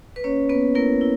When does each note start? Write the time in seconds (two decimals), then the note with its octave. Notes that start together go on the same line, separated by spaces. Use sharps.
0.16 B4
0.24 A#3 C#4 C#5
0.49 A#3 B3 B4
0.75 A#3 E4 A#4
1.01 E4